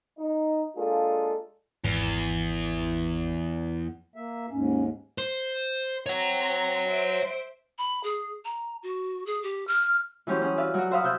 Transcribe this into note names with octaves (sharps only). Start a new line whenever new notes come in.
D#4
G#3 A#3 D4 F4 G#4 A4
G#1 E2
A#3 E5
D#2 G#2 C#4
C5
C4 C#5 F#5 A#5
C5 E5 D7
B5
G#4
A#5
F#4
G#4
G4
F6
E3 F#3 C#4 G4 C5
C#4 G#4
B4 D5 E5 F5
F#3 F#4
F#4 C5 E5 F5 B5 D#6
C3 F#4 E5 E6 F#6 G6